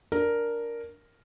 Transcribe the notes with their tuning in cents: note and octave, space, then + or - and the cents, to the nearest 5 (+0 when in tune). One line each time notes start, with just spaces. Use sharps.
D4 +0 A#4 +0